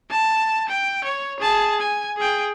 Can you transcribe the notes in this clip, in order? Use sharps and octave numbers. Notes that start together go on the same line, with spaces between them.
A5
G5
C#5
G#4 A5
G#5
G#4 G5